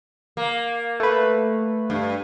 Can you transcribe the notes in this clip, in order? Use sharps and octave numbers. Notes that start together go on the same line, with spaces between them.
A#3
A3 B4
G2